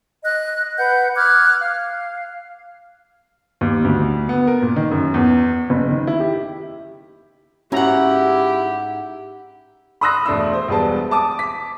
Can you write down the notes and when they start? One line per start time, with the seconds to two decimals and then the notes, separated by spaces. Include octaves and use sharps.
0.24 D#5 F#6
0.78 B4 F#5 G6
1.15 D6 F6 F#6 G#6
1.59 F5
3.61 D#2
3.84 D2
4.29 B3
4.47 A#4
4.62 A#2
4.76 D#3
4.91 F#2
5.14 E2
5.70 F#1
5.89 D#3
6.07 E4
6.20 G4
7.72 G#2 C#4 E4 F#4 G4 F#5 A#5
10.01 B5 C6 D#6 E6 F#6 A#6
10.25 E1 A3 D4 C6 E6
10.53 C5
10.68 E1 G3 G#3 B3 A5
11.11 A5 D6 D#6
11.39 D6 B6